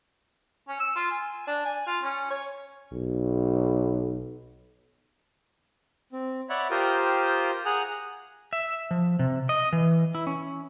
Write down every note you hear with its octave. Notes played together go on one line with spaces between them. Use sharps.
C#4
E6
F4
G#5
D4
G#5
F4
C#4
C#5
B1
C4
C#5 D5 E5 F#5 B5
F4 G4 A#4 C5 G5 D#6
G#4 F#5 G#5 A#5 D#6
E5
F3
C3
D#5
E3
E4
C#4